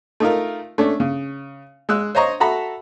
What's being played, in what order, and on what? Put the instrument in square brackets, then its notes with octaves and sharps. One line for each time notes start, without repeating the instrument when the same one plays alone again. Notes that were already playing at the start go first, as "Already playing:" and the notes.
[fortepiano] A3 D#4 F4 A#4
A3 C#4 D4
C#3
G#3 E6 F#6
C5 C#5 D#5 A#5 C#6
F#4 A4 E5 A#5 B5